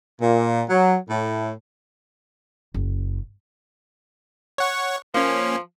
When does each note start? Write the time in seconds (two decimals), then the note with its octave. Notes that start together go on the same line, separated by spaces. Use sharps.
0.21 A#2
0.69 F#3
1.09 A2
2.74 F#1
4.58 C#5 F#5 C#6
5.14 F3 A#3 C#4